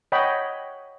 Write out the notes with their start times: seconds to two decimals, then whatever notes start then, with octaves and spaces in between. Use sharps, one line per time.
0.12 C#5 D#5 F#5 G5 B5